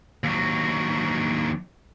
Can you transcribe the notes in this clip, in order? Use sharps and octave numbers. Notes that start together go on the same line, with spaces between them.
D#2 F#3